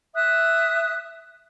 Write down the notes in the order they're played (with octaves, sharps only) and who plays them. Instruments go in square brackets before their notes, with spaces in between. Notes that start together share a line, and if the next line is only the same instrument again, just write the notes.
[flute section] E5 D#6 F#6